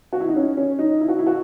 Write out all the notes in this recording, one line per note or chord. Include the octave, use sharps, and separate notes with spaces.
F#4
E4
D#4
C#4
C#4
D#4
E4
F#4
E4
F#4